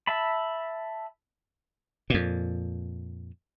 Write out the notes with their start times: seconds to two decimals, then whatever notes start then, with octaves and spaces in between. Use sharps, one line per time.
0.07 E5 A5 B5
2.10 F2 A#2